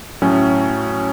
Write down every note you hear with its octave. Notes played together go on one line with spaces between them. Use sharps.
A2 F#3 C#4